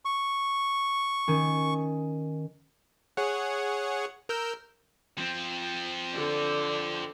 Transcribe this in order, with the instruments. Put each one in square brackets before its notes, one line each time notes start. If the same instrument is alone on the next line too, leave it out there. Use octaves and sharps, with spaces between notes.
[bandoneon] C#6
[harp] D#3 C#4
[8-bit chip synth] G#4 C#5 F#5
A#4 E6 G6
[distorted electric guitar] F3 C4
[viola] D3 D5